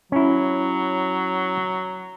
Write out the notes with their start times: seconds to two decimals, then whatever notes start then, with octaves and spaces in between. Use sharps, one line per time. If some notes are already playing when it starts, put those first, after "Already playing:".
0.12 F#3 C#4 E4